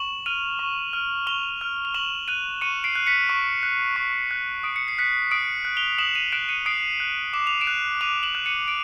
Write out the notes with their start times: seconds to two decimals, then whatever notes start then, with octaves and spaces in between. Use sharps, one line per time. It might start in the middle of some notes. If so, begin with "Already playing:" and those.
Already playing: C#6 E7 F#7
0.26 F6 D#7 F7
0.59 C#6
0.93 F6
1.27 C#6 F7 G7
1.61 F6
1.85 F7
1.95 C#6 E7 F#7
2.28 F#6 D#7 F7
2.61 C#6 C#7 D#7
2.84 C7 D7
2.95 F#6
3.07 B6 C#7
3.29 C#6
3.63 F#6
3.96 C#6 C7
4.31 F#6
4.64 D#6 D7
4.76 C#7
4.88 C7
4.98 F#6 B6 C#7
5.31 D#6 C7 D7
5.65 F#6
5.77 F7 G7
5.98 D#6 E7 F#7
6.15 D#7 F7
6.32 F#6 D7 E7
6.49 C#7 D#7
6.66 D#6 C7 D7
7.00 F#6
7.33 D6 E7
7.47 F7
7.61 D7 E7
7.67 F#6
8.01 D6 D#7 F7
8.23 E7 F#7
8.35 F#6
8.46 C#7 D#7
8.68 D7